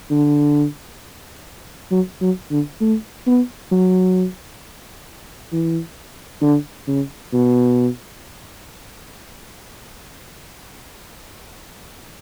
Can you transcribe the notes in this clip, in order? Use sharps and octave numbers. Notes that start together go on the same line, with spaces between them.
D3
F#3
F#3
D3
A3
B3
F#3
E3
D3
C#3
B2